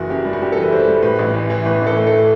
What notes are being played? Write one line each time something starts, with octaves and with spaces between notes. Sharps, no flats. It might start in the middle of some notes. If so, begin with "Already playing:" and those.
Already playing: F#1 E3 F#4
F#2 G4
G3
F#4
G3 G4
E3 A4
B4
G3 C5
G3
A2 B4
A1
E3
E3
A2 B4
A1
A4
A3
A4